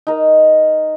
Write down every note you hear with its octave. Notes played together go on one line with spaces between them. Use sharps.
D#4 A#4